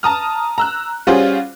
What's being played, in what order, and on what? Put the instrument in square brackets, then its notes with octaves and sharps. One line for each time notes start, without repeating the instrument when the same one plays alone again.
[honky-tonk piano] A5 A#5 D#6 F6
A#5 E6 F#6
G3 C#4 F4 F#4 G#4 C5